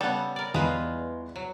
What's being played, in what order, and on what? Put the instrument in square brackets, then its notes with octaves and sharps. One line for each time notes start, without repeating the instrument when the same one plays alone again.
[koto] C#3 B3 A4 [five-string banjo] G3 F#5
[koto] A#4 D5
[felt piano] E2 [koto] G3 B4 A#5 [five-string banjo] G#3 F4
[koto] F#3